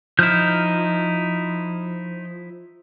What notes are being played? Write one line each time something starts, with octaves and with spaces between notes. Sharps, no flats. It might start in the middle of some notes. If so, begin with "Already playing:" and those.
F3 D#4 E4 F6 G6